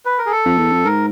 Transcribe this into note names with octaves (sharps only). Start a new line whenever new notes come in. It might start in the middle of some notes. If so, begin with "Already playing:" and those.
B4
A#4
G#4
A4
F2
E2
F2
G#2 A#4